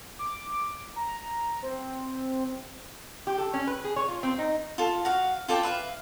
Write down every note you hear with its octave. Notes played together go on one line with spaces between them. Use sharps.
D6
A#5
C4
G4
A4
C#4
B4
G#4
C#5
F4
C4
D#4
F4 A4
F#4 F5
F4 A4 D5 G5
B4 E5 F5